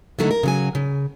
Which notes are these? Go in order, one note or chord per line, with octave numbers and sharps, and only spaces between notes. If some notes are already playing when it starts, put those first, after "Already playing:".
D3 D#3 F#3 A3 E4 F#4
A#4
C#3 F#3 G#5
C#3